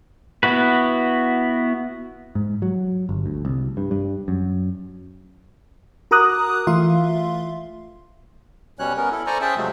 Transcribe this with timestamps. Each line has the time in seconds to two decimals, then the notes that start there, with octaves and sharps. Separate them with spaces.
0.43 B3 E4 F#4 B4
2.35 G#2
2.62 F#3
3.09 G1
3.26 D2
3.45 C2
3.77 G2
3.91 G2
4.28 F#2
6.11 F#4 A#4 A#5 D6 D#6 F#6
6.67 E3 A3 F4 E5 F5 C6
8.79 B2 G3 C#4 C#5 F#6
8.97 B3 C#4 A#4
9.12 E4 A4
9.27 A4 C5 D5 G#5 A#5 C#6
9.41 C#4 G#4 C5 E5 G5 A5
9.57 C3 F3 F#3 G#3 A3 C4